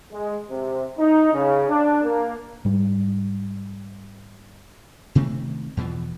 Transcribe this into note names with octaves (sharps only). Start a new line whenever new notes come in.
G#3
C3
D#4
C#3
D4
A#3
G#2 G3
C3 D#3 A3 C4
E2 B2 E3 F3